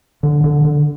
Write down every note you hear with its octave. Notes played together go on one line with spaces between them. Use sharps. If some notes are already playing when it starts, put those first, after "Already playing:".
D3
D3
D3